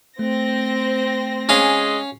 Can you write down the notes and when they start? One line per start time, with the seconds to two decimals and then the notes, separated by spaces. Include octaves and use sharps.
0.19 A3 C4 A#6
1.49 G#3 C#4 F5